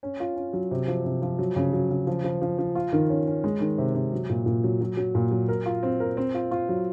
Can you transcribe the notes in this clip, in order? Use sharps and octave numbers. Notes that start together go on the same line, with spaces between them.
C#4
F4
C#4
F#3
C3
F3
C3
F3
F#3
C#3
F#3
C#3
F3
F3
F3
F3
F4
D#3
C#4
C#4
G#3
D#3
C3
C3
F#3
A#2
A#2
F#3
F#3
F#3
A#2
F#3
A#4
F4
C4
A#4
C4
F4
F4
F#3